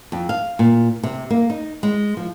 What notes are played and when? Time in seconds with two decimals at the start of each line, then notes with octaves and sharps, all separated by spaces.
0.12 F2
0.29 F5
0.59 A#2
1.03 C3
1.30 A#3
1.50 D#4
1.83 G#3
2.17 F3